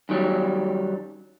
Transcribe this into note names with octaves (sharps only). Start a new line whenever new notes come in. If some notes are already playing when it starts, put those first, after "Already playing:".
F#2 D#3 F#3 G3